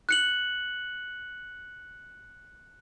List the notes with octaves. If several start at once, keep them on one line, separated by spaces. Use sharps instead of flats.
F#6 C#7 F#7